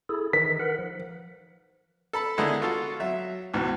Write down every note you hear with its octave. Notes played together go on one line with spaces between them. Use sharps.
E4 G#4 A4
D#3 E3 D#4 B6
A#4 B4 F#5
F3
A4 A5 B5
D3 D#3 G#3 B3 D#4 E4
F4 F#4 A4 F5
F#3 E5
C#2 G#2 B2 E3